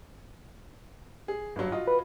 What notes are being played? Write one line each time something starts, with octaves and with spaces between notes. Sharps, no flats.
G#4
G1 F#3
F4 F#4 D#5
B4